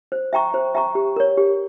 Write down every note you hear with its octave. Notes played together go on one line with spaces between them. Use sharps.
C5
E5 G5 A#5 C#6
C5
E5 G5 A#5 C#6
G4
A#4 C#5
G4